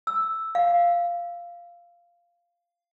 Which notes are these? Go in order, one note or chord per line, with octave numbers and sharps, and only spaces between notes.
E6
F5